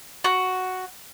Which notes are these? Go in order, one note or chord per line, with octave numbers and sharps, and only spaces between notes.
F#4